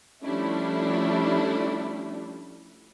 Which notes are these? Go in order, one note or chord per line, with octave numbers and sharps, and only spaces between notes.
F3 G3 A3 C#4 D4 E4